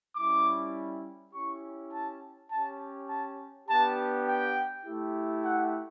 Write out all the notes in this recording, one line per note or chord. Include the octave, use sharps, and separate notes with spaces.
G3 C#4 E4 D6
C#4 E4 G4 C#6
A5
C#4 G4 A5
A5
B3 D4 G4 A5
G5
A3 E4 G4
F#5